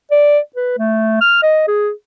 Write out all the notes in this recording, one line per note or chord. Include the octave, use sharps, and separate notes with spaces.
D5
B4
A3
F6
D#5
G#4